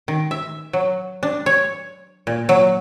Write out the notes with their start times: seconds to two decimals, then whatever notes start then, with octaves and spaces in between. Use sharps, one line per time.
0.08 D#3
0.31 E5
0.73 F#3
1.23 D4
1.46 C#5
2.27 A#2
2.49 F#3